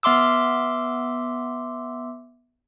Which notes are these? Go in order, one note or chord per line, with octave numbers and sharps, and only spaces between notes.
B3 E5 C6 D6 E6